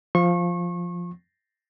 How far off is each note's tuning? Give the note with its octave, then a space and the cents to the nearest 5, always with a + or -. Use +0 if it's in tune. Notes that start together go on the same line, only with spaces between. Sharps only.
F3 +0 C#6 -30